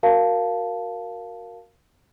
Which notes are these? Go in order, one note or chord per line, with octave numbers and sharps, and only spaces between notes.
F#4 A#4 F5 A5